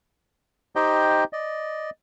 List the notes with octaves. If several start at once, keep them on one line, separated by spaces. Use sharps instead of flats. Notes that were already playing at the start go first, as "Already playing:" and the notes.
D#4 G4 C5 D#5 G5
D5 D#5